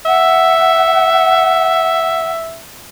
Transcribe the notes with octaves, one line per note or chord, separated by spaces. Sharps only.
E5 F#5